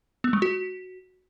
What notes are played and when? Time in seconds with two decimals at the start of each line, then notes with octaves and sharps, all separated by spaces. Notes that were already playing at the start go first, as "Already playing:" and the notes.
0.24 B3
0.33 G#3
0.42 F#4